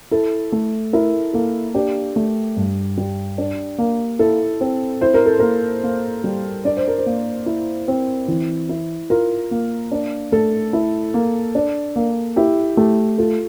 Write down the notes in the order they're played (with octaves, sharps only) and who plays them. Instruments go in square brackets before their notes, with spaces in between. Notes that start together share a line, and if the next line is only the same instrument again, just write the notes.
[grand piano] E4 [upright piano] A4
[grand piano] A3
[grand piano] E4 [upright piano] A#4
[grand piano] A#3 [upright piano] A4
[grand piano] D4 [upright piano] G4
[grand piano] A3
G2
G3
D4
A#3
[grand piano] E4 [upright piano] A4
[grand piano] C4
[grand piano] E4 [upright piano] C5
[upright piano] A#4
A4
[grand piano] A#3 [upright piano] A#4
[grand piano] A#3
G3
[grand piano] D4 [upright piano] D5
[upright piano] C5
A#4
C5
[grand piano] A#3
E4
C4
E3
E4
[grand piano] F4 [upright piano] A#4
[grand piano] A#3
D4
[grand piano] A3 [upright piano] A4
[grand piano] E4
A#3
D4
A#3
[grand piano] E4 [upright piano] G4
[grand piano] A3 [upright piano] G4
[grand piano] F4 [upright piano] A4